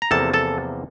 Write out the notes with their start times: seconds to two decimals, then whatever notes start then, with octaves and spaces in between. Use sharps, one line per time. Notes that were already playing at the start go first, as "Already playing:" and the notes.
0.02 A#5
0.11 E2 C3 F3 A#3 A4 A5
0.34 A4 A5